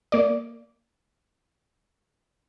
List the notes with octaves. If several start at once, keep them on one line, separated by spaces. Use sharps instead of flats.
A#3 D5